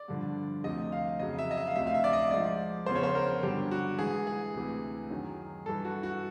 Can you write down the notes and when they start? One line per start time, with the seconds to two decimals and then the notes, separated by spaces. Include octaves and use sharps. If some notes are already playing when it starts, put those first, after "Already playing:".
Already playing: D5
0.08 G2 D3 F3
0.64 D2 C3 F3 D#5
0.92 F5
1.19 F2 C#3 F#3 D#5
1.39 E5
1.51 D#5
1.57 E5
1.67 F5
1.75 D2 C3 F3 E5
1.87 F5
1.94 E5
2.04 D5
2.13 D#5
2.31 G#2 F3 D5
2.86 E2 C#3 F3 C5
2.96 C#5
3.03 C5
3.15 A#4
3.43 G2 D3 F#3 G4
3.71 F#4
3.99 G#2 E3 G#4
4.27 G#4
4.54 D2 C3 E3
5.10 F#2 D#3 F#3
5.66 G2 E3 A4
5.85 F#4
6.03 F#4